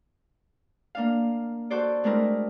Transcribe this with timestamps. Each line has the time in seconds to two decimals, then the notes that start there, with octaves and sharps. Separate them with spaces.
0.95 A#3 D4 F5
1.70 F#4 A4 C5 D5
2.04 G#3 A3 C4 D4 E4 A#4